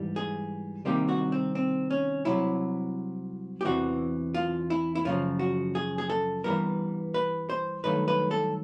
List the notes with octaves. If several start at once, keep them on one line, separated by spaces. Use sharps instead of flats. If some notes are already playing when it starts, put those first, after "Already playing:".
Already playing: G#2 E3 G3
G#4
C2 C3 D#3 G3 A#3 G4
F#4
C4
C4
C#4
C2 C3 D#3 F#3 E4
G4
E2 C3 E3 F#4
F4
E4
E4
F#2 C#3 F3 F4
F#4
G#4
G#4
A4
G2 E3 G3 B3 A#4
B4
C5
G2 D#3 F#3 A3 B4
B4
A4